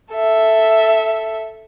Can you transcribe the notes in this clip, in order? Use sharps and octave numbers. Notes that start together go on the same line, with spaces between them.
A4 E5